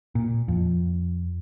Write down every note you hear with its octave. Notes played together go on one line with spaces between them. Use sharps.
A#2
F2